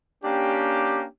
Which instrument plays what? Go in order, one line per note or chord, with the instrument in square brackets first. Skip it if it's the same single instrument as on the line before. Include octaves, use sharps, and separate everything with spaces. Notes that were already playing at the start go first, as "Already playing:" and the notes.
[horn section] A#3 C#4 D4 G4